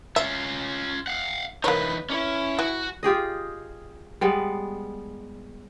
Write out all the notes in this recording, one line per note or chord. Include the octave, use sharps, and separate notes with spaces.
C#4 F4 E5
F5 F#5
E3 A#3 D#4 B4 C#5
C#4 E4
E3 F#4
F4 G4 G#4 D#5
G3 G#3 B3